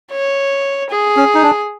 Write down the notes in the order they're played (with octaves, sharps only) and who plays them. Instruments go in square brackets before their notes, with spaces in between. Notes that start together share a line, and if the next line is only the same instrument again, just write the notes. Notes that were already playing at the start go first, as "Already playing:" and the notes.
[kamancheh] C#5
G#4
[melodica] C#4
D#4
D4